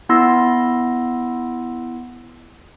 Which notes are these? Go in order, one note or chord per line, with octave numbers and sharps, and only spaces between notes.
B3 E4 C6 E6 A#6